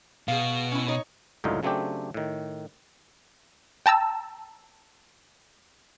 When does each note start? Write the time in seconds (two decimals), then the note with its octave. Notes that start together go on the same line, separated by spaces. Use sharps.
0.28 B2 G#4 F5
0.72 C#4 E4
0.88 D#4 C#5
1.44 C#2 F#2 A2 D3 D#4 F4
1.63 C#3 F#3 A3 C4 D4 G4
2.14 A2 D#3
3.86 G5 A5 A#5 E6